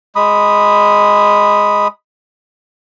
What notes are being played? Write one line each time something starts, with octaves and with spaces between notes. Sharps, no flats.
G#3 B5 D#6